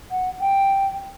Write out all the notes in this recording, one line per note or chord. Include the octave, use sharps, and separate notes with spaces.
F#5
G5